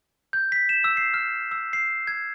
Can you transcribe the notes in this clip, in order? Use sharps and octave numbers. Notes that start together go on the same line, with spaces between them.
G6
B6
E7
E6
C7
F6
E6
C7
G#6